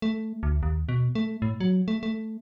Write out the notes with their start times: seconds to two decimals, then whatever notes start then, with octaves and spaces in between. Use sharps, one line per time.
0.02 A3
0.43 D2
0.63 D#2
0.89 B2
1.15 A3
1.42 A2
1.60 F#3
1.88 A3
2.03 A3